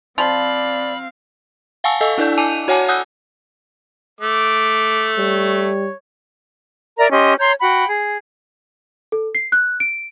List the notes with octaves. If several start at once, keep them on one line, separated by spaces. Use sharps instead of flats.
F3 C4 D5 F5 B5
F5 F#5 G#5 A5 C#6 E6
A4 D#5 F5 G#5 E6
D4 E4 A4 D5 G6
G#5 A5 D6 D#7 F7
F#4 C#5 F#5 G#5 A5 D6
F#5 G#5 D#6 E6 F#6 G6
A3 D6
G3 C#5
A#4 D5 E5 A#5
C#4 G4 D#5 C6
C#5 A#5 C6 G6
F#4 F#5 G5 B5
G#4
A4
C7
F#6
D7